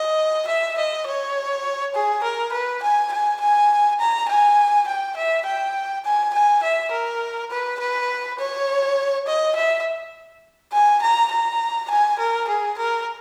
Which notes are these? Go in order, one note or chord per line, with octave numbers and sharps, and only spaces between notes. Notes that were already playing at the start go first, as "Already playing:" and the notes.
Already playing: D#5
E5
D#5
C#5
G#4
A#4
B4
G#5
G#5
G#5
A#5
G#5
G5
E5
G5
G#5
G#5
E5
A#4
B4
B4
C#5
D#5
E5
G#5
A#5
A#5
G#5
A#4
G#4
A#4